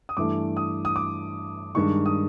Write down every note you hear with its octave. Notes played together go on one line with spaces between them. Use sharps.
D#6
G2 E3 A3 D6
D#6
D#6
D6
G2 D#3 G#3 C#6
D#6